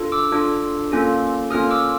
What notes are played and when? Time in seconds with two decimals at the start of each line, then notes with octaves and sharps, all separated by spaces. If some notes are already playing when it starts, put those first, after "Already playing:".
Already playing: D4 F4 A4
0.12 D6 E6
0.32 D4 F4 A4
0.92 A#3 C#4 F4 A4
1.50 A#3 C#4 F4 A4 D#6 F6
1.70 D6 E6